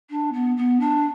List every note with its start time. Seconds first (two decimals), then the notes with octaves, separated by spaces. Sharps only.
0.10 D4
0.33 B3
0.57 B3
0.80 D4